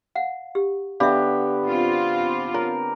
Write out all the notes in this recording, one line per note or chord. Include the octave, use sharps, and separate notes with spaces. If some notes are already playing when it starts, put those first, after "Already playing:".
F5 F#5
G4
D3 B3 G4 E5 F5
C4 F4
A#4 C#5